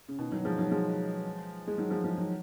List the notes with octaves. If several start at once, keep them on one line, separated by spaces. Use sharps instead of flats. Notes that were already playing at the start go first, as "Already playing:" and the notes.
C#3
B2 D#3
D#3 F#3
F3 G#3
D#3 F#3
F3 G#3
G#3
D#3 F#3
F3 G#3
F3 G#3
D#3 F#3